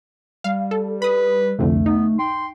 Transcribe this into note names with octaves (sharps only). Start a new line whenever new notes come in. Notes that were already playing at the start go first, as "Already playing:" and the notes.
G3 F5
A4
B4 B5 D#6
C2 F2 D3 A3
B3 D#4
G5 C6